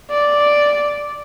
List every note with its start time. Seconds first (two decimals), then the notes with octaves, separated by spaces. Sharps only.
0.10 D5